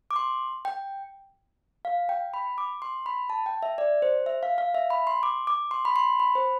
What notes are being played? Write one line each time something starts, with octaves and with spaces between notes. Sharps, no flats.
D6
C6
G5
F5
G5
B5
D6
C6
B5
A5
G5
E5
D5
C5
E5
F5
F5
E5
B5
C6
D6
D6
C6
B5
C6
B5
C5